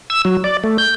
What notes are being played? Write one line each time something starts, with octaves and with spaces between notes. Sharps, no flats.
E6
F#3
D5
A3
G6